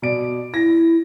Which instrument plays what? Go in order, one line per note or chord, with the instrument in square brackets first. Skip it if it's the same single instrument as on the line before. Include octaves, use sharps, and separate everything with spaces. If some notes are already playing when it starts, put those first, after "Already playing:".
[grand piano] B2 D5 D7
[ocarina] E4 [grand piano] A#6